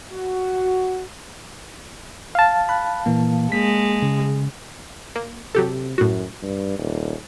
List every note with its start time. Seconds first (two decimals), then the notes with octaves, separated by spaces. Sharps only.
0.11 F#4
2.35 F5 A5
2.69 B5 F#6
3.06 A#2 E3 A#3
3.52 G#3 A#3 B6
4.02 C#3
5.16 A#3
5.55 C3 F#3 G4 A4
5.98 F#2 A2 F#4
6.42 G2
6.79 D#1